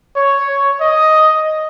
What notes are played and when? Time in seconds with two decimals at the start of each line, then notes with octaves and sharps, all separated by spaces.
0.16 C#5
0.48 C#5
0.81 D#5